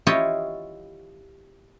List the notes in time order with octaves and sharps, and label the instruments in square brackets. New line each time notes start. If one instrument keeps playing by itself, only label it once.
[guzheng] E4 F4 G4 C#5 D#5